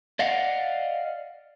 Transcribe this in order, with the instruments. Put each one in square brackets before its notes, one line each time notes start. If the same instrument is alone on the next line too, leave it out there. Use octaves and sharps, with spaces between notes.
[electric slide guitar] D5 D#5 F5 F#5